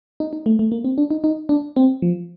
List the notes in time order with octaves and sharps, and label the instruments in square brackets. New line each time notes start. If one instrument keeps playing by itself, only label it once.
[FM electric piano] D#4
D#4
A3
A3
A#3
C4
D4
D#4
D#4
D4
C4
F3